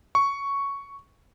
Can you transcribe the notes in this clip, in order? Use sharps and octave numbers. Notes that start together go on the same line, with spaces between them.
C#6